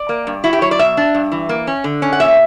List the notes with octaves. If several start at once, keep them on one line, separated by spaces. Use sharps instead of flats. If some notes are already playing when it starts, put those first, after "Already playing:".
Already playing: D5
A#3
G2
E4 F#4
G4
F#3 C#5
D5
B2 E5
D4
G2
E3
A#3
C#4
D3
C#4
F#5
A#2 E5